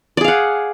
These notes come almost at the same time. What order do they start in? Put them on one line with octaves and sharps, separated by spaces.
D5 G#4 F5 F#5